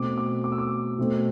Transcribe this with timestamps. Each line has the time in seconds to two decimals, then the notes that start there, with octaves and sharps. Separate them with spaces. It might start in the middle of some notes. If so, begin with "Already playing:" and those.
Already playing: B2 A3 C4 D6
0.18 D6
0.44 D6
0.52 E6
0.58 D6
0.98 B2 A3 C4